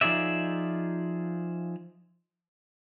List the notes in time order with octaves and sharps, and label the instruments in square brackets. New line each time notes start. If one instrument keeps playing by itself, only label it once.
[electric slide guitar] F3 D#4 F4 G#4 D5 E5